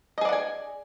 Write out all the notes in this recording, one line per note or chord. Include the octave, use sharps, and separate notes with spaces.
G#4 D5 D#5 F#5 G#5